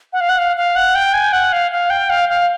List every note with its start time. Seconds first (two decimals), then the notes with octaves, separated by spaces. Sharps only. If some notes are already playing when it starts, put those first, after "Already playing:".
0.13 F#5
0.21 F5
0.29 F#5
0.38 F5
0.57 F5
0.76 F#5
0.95 G5
1.14 G#5
1.33 F#5
1.53 F5
1.71 F5
1.90 G5
2.10 F5
2.29 F5